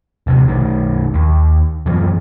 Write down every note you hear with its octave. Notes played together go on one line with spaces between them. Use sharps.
D#1 C3
B1 D#3
D#2
F#2 E3 F3